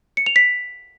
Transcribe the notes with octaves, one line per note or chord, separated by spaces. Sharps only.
C#7
F7
B6